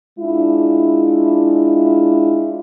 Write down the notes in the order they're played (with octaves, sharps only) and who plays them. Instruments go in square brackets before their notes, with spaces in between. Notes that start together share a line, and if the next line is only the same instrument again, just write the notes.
[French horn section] G#3 D4 E4 F4